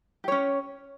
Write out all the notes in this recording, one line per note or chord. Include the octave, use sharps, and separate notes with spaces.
C#4 G4 C#5